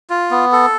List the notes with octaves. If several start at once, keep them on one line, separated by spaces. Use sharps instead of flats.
F4
B3
A4